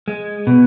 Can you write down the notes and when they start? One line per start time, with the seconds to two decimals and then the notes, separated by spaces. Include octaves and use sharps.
0.08 G#3
0.47 B2